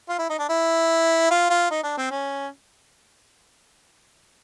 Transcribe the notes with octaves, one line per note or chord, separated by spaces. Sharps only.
F4
E4
D#4
D4
E4
F4
F4
D#4
D4
C4
C#4